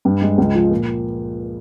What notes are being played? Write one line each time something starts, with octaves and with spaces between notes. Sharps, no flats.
G2
G#3
C#2
F3
A#2